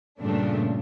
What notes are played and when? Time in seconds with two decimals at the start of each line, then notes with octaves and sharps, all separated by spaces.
0.20 G2 A#2 C#3 A3 D4